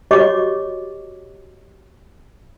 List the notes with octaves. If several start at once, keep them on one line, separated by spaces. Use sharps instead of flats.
F#4 G4 C#5 D#5 C#6 D6